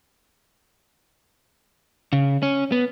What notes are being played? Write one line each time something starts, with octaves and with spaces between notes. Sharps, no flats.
C#3
C#4
B3